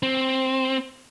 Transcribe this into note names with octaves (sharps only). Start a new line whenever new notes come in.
C4